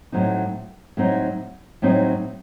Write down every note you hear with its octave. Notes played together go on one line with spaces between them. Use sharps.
A2 F#3 C4 D#4
A2 F#3 C4 D#4
A2 F#3 C4 D#4